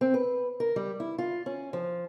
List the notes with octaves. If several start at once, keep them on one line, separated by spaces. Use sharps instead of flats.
C4
B4
A#4
G3
E4
F4
C#4
F3